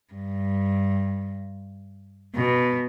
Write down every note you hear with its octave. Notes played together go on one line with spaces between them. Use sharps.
G2
B2